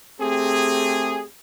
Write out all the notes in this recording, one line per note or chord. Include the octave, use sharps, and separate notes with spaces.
A3 C4 G4 G#4